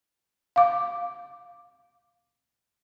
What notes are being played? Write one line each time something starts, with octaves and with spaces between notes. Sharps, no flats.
F5 D6